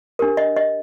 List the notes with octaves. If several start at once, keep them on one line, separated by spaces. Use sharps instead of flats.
D4 G4 A#4
D#5
D#5